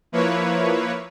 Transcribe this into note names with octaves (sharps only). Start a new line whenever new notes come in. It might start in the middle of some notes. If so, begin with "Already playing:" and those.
F3 A#3 E4 B4 C#5